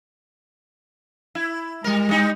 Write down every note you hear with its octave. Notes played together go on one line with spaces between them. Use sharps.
E4
G3 G#3 A#4
G3 D#4